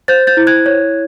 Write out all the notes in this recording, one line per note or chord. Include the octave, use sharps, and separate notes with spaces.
C5 G6 A6
G6 A6
E4
F#6 G#6
C#5